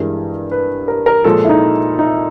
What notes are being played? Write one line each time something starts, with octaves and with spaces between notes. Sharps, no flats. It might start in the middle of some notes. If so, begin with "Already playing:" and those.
Already playing: G2 E3 G#3 A#4
B4
A#4
A#4
A#2 F3 G#3 A4
E4
D#4
D#4